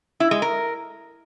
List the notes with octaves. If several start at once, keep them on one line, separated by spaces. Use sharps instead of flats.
E4
G#3
A#4